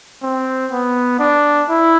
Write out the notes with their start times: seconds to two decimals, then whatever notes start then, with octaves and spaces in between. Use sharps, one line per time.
0.22 C4
0.72 B3
1.19 D4
1.69 E4